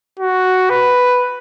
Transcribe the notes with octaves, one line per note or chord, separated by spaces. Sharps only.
F#4
B4